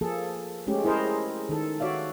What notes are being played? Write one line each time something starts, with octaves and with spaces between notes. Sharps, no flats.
F3 A#3 G#4 A4
G#3 A3 C#4 G4
E4 G#4 A#4 C5 D#5
D#3 A4
F#4 C#5 D5 E5 F5